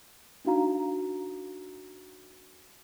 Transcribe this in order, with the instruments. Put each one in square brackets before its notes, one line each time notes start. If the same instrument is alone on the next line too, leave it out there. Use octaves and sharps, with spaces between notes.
[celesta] D4 D#4 F#4 F5 A#5